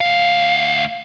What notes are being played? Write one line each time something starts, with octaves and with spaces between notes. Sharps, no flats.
D2 F5